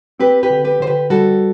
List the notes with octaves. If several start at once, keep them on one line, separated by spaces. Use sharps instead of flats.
C4 G4 B4
G4 B4
D3
G4 B4
D3 C5
G4 B4
G3 F#4 A4